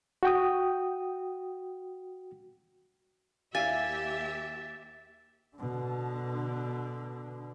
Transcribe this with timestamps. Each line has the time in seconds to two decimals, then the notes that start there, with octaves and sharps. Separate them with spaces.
0.23 F#4 G5 D#6
3.55 D#2 E4 G4 D5 E5 F5 G#5 A6
5.57 B2 D3